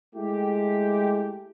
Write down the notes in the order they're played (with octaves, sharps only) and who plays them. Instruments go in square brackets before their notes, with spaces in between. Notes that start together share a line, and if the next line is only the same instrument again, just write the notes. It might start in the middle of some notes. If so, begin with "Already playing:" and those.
[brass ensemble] G#3 A3 E4 G4